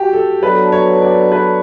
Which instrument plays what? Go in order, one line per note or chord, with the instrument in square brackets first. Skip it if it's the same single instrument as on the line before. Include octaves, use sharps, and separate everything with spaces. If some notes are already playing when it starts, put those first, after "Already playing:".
Already playing: [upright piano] F#4 G4
A4
[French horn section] F#3 B3 D4 A4 [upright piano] B4
[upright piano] C#5
D5
B4